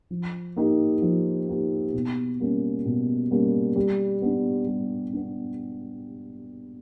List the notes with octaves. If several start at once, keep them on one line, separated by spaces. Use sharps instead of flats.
F3
A#3 D#4 G4
F3
A#3 D#4 G4
B2
G3 A#3 C#4
B2
G3 A#3 C#4
G3
B3 D4
G3
B3 D4